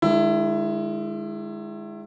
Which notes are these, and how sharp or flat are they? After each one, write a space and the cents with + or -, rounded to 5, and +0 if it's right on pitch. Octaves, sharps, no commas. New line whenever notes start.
D#3 -35 G#3 +0 E4 +20